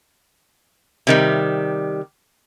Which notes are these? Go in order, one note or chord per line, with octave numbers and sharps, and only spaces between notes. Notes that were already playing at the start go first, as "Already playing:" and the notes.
C3 D#3 G3